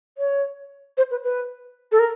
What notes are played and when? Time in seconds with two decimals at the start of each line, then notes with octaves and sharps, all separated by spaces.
0.18 C#5
0.97 C5
1.11 B4
1.24 B4
1.92 A4
1.99 A#4